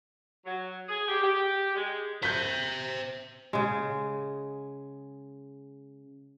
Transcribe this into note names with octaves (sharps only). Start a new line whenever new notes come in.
F#3
G#4
G4
G4
G#3
C5 E5 G6 B6
C#3 G#3